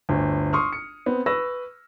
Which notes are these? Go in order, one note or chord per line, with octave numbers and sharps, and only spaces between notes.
G1 D2
C6 C#6 D#6 F6
C#7
B3 C4
B4 C#6 E6 A#6